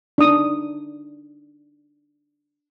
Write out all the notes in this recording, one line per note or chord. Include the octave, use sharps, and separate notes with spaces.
D4 D#4 D#6